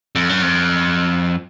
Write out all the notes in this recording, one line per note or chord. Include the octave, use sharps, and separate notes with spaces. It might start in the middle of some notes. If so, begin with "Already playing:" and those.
F2
F#2
F2